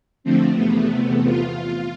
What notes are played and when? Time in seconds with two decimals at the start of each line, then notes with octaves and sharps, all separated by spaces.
0.24 D3 F3 A3 C4
0.53 E2 C3 A3 B3
1.25 F4